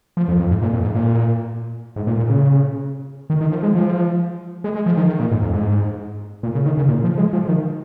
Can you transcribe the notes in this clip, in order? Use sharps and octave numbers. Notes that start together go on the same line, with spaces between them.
F3
F2
F2
G#2
A#2
F2
G#2
A#2
G#2
A#2
A#2
C#3
D#3
D#3
F3
G#3
F3
G#3
G#3
F3
D#3
D#3
A#2
G#2
F2
G#2
A#2
C#3
D#3
C#3
A#2
F3
G#3
F3
D#3